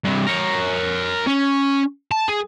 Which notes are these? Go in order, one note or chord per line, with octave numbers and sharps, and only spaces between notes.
G2 C3
A#4 C#5
C#4
A5
G#4